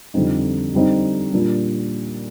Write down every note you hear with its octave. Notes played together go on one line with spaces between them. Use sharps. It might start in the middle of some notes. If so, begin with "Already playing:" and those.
F2 D3 G3 C4 D#4
D3 G3 C4 D#4
A#2 G3 D4